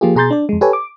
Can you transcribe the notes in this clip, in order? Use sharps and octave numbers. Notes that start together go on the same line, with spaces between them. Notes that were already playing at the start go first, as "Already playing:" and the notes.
F3 A#3 F4 G4 G#4
B2 G#4 A#5 C6 G6 A6
D4 D5
F2 G#3
G4 A4 B4 C#5 G#5
D6